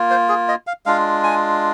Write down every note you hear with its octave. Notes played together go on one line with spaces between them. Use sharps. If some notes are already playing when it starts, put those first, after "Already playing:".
Already playing: A#3 F4
C5
G#4
D#5
F5
G#3 D4 F4 F5
G#5